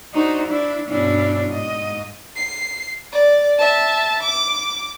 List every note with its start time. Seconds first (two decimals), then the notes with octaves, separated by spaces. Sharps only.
0.13 D4 D#4 F#4 C5
0.46 D4 E4
0.88 G2 B2 C#4 D4 E4
1.48 G#2 D#5
2.36 C7
3.13 D5
3.59 E5 A5
4.23 D6